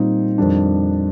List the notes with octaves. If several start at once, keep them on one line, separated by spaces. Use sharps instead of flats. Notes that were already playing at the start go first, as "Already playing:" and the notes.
Already playing: A#2 G3 C4 D#4
F2 D#3 G3 D4